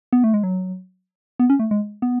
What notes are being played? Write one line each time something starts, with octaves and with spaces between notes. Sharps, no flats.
B3
A3
G#3
F#3
B3
C#4
A3
G#3
B3